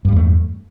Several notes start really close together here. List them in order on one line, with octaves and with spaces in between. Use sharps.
G2 G3 E2 A3